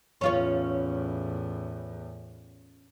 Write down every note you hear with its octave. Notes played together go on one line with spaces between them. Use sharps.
E2 A2 C#4 F4 C#5